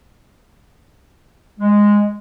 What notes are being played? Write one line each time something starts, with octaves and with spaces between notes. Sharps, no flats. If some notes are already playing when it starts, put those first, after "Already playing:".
G#3